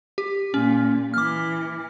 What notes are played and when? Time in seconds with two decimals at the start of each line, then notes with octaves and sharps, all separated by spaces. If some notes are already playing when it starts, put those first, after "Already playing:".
0.18 G4
0.54 A#2 C#4
1.14 E3 D6 F6